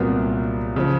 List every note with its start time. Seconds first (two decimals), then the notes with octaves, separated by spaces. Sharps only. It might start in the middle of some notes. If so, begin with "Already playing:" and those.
Already playing: C2 A#2 F#3 B3 A#4
0.76 C#3 F3